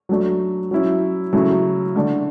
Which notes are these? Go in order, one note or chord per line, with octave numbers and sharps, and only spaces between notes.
F#3 A3 D4
F#3 C#4 E4
C#3 F#3 A3 E4
D3 A3 D4